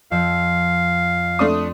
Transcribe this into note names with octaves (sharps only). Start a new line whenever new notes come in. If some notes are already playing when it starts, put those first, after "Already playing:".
F2 E5 F5 G5
A3 C4 D4 D#6